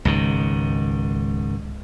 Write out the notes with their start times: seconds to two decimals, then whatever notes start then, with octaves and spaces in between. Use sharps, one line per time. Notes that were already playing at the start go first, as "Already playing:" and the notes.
0.05 C#2 G#2 D#3